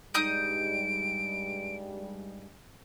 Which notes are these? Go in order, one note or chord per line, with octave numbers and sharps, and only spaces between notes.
G2 G3 G#3 D#4 D#6 G6 D7